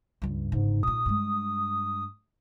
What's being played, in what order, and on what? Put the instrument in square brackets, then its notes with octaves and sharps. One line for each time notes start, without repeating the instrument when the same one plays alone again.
[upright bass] C#2 G2
[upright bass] G1 C#3 [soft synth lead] G#2
[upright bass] A#2 D#4 [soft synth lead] D#6
[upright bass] G2 G#3